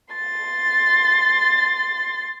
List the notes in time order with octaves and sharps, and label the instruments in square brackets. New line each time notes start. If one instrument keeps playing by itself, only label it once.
[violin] C6 A6